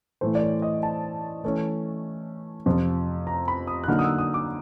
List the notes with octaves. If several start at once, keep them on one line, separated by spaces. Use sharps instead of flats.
A2 E3 A3 C5
D5
C#5
D#5
A5
E3 A3 C#4
F2 C3 F3
A#5
B5
D#6
F#6
D3 F#3 A#3 D#4 F6
D#6
E6
D#6
D6